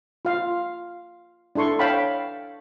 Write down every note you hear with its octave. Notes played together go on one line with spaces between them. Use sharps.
F4 F5
D4 E4 A4 C6 C#6
C#5 F5 G5 A5 B5